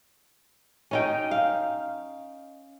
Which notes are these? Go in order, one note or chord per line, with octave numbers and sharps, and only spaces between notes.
C#4 D#4 G5
F5